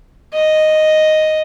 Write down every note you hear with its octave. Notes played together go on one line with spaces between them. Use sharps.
D#5